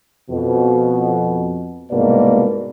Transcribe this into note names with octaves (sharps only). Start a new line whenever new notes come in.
F2 B2
C2 G#2 B2 A#3 D5